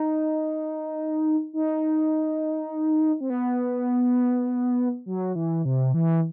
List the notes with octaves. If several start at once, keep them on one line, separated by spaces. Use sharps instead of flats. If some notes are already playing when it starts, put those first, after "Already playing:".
Already playing: D#4
D#4
C4
B3
F#3
E3
C3
E3